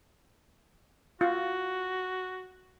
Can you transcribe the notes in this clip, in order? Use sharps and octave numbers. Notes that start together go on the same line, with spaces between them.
F4 F#4